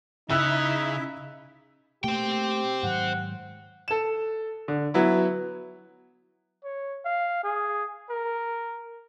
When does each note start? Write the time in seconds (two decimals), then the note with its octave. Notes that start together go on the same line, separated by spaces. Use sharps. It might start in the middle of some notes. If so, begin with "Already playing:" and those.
0.30 C#3 D#4 E4 E5 A#5 E6 F#6
2.04 B2 A3 A#3 G4 C5 G5
2.83 G#2 D#3 F#3 F#5
3.88 A4 E7
4.68 D3
4.94 F#3 B3 E4
6.64 C#5
7.05 F5
7.44 G#4
8.11 A#4